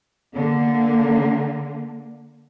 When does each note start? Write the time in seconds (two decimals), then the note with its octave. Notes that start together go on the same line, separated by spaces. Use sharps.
0.34 D3 A#3